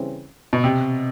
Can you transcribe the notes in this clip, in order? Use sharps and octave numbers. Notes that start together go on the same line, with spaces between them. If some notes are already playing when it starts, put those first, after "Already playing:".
Already playing: C#3 E3 G3 C4
B2
C3